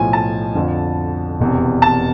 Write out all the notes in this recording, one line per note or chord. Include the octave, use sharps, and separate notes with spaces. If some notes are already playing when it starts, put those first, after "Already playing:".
Already playing: B1 A2 F3 G#5
A5
F2 D3 F3
E1 E2 C3
A5